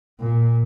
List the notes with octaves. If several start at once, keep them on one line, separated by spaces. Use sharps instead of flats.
A#2